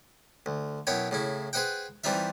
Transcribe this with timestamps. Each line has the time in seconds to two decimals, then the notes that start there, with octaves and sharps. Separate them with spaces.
0.46 D2
0.87 F#2 B2 E4 C#5 G5
1.11 A2 C#3 E4
1.53 G#4 B4 C5 D#5 F#5 G5
2.04 E3 G3 C4 D#4 F4 E5